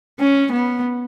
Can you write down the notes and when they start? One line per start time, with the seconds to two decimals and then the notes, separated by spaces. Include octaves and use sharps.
0.19 C#4
0.52 B3